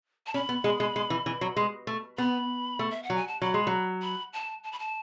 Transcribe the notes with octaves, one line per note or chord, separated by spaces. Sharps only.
A5
C#4 B5
B3
G#3
G#3
G#3
E3
E3
F#3
G#3
A3
B3 B5
A3
E5
F#5
F#3
G#5
A5
F#3 B5
G#3
F#3
B5
A5
A5
B5
A5